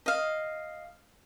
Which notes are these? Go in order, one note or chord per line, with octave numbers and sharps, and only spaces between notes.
D#5 F5